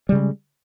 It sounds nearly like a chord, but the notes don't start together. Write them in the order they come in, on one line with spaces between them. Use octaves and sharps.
G3 C#3 G#3